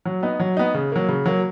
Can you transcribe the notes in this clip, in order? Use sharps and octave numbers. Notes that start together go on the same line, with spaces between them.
F#3
B3 D#4
F#3
B3 D#4
C#3
F#3 A#3
C#3
F#3 A#3